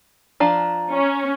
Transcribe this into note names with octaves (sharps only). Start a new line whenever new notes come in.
F3 D4 F5 A#5
C#4